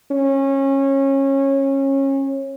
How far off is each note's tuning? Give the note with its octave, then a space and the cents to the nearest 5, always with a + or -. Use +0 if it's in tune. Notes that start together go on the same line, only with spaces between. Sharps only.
C#4 -25